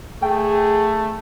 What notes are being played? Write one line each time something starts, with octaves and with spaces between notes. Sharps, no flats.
A3 G#4 G5